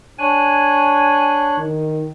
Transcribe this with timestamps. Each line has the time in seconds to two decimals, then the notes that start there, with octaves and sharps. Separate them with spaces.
0.19 D4 C#5 G#5 F#6
1.58 D#3